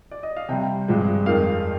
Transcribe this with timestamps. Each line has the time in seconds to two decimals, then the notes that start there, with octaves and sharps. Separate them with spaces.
0.11 D5
0.23 D#5
0.36 F5
0.49 C3 G3 G5
0.88 G2 F3 G#3
1.26 F2 D#3 G#3 F5